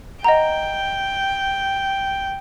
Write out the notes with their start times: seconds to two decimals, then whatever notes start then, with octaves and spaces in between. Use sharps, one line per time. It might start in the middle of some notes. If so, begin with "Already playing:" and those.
0.24 D#5 F#5 G5 A#5